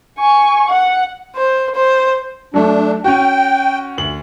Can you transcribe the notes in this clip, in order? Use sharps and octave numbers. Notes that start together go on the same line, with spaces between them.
G#5 C#6
F#5
C5
C5
F#3 A3 D4
C#4 F#4 G5
D2 F#7